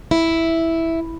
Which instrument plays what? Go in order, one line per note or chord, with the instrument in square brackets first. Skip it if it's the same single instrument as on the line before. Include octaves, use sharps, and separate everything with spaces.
[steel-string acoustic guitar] E4